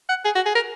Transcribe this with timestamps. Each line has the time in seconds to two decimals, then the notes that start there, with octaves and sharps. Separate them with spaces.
0.09 F#5
0.25 G#4
0.35 F#4
0.46 G#4
0.55 A#4